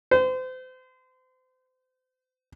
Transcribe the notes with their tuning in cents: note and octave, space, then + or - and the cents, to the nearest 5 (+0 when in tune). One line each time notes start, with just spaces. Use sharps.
C5 -35